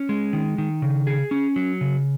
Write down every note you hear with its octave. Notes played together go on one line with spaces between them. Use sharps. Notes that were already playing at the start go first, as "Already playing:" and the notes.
Already playing: C#4
G#3
D#3
D#3
C#3
G#4
C#4
F#3
C#3